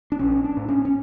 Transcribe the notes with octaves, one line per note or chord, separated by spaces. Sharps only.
D4
A#1 C#4
D4
A2
C#4
C#4